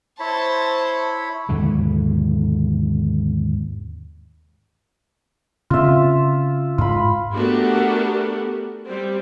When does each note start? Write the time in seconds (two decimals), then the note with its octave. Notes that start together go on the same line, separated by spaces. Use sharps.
0.20 E4 C5 C#5 A5 B5
1.49 D#2 G#2 B2 D3
5.70 C#3 C4 F4 E5
6.78 G#2 F4 B5
7.33 A3 B3 D4 F#4 G4 A#4
8.86 G3 C4